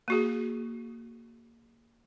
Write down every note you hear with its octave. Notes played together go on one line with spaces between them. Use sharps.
A#3 F#4 G#4